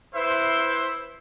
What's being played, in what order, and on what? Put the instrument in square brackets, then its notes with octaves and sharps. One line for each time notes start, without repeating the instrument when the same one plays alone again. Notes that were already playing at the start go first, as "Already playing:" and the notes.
[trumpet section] E4 B4 C5 E5